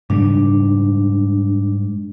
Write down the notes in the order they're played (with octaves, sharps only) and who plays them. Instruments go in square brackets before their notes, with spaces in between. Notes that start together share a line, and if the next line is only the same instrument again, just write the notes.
[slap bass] G#2 C#3 G3 [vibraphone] D4